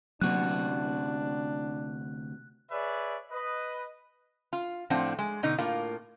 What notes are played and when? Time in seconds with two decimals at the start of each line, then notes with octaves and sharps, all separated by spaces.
0.21 D2 C3 F#3 A#3 D4 F#4 F#6
2.71 G#4 B4 C#5 D5 E5
3.30 B4 D#5
4.53 F4
4.90 A2 F3 C4 D4 F#5
5.19 G#3
5.43 B2 D3 D#4
5.58 A2 A#3 F4